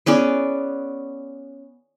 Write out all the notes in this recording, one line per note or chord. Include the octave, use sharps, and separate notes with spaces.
B3 C#4 G#4 D5